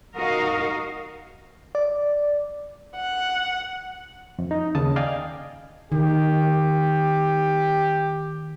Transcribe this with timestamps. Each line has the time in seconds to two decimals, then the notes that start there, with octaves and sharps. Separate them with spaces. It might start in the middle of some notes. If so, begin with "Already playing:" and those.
0.16 D#4 F#4 A#4 D#5 F5
1.75 D5
2.97 F#5
4.39 F2
4.51 D#4
4.75 D#2 C#3 A5 D#6
4.96 D5 D#5 F5 G5 G#5
5.92 D#3 G4